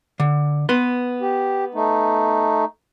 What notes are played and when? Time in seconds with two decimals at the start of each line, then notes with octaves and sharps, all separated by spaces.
0.20 D3
0.69 B3 B4 C6
1.21 G4
1.75 A3 D#4